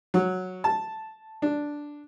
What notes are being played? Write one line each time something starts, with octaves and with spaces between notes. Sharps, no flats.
F#3
A5
D4